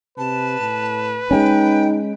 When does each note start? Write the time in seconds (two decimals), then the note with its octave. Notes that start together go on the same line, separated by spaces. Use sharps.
0.18 C3 B4 A5
0.60 A2
1.31 G#3 A3 C#4 D#4 G5